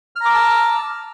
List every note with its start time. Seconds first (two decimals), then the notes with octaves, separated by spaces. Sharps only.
0.16 F6
0.20 A#5
0.25 D6
0.30 E6
0.34 A5